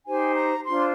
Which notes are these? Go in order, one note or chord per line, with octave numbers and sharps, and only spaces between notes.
D#4 G4 C5 G#5
A#5
D4 F4 C5 C6